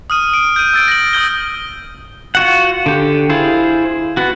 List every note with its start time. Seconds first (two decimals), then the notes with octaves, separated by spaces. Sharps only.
0.10 D#6 F6 D#7
0.34 D7
0.56 G6 D#7
0.73 E6 A6 D7
0.88 A#6 F#7
1.13 D#6 F6 G6 G7
2.35 F4 F#4 F#5
2.86 D3 G4
3.30 E4 F4 G#4 C5
4.17 B3 F#4